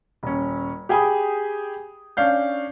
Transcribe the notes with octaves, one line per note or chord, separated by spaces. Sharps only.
D#1 C#4
G4 G#4 G5 G#5 B5 D#6
C#4 D4 F5 G6